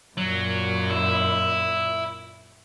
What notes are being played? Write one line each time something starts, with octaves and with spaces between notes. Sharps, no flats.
F#2 A#2 F#3
E4